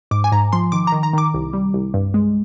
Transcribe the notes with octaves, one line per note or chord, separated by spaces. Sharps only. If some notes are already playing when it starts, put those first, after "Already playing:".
G#2 D6
G#5
G#2 A#5
F3 C6
D#3 D6
D#3 A#5
A#5
D#3 D6
C2
G3
C2
G2
G#3